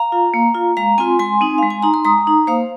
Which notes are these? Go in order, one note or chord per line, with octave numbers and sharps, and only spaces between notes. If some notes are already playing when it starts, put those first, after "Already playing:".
Already playing: F5 A#5
F4
A#3
F4
G#3 F5 A#5
C4 F4 G#5 C6
G#3 G#5 C6
C4 D#4
G#3 F5
G#5
D#4 A#5
C6
G#3 A#5 D#6
D#4
A#3 C5 F5